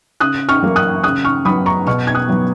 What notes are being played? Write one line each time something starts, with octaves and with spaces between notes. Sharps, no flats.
C#3 D#6 F#6
C#6 F6
F#3 A#3
D#6 F#6
C#3 D#6 F#6
C#6 F6
F#3 B3 B5 D#6
A#5 C#6
B2 C#6 F6
G#6
D#6 F#6
F#3 B3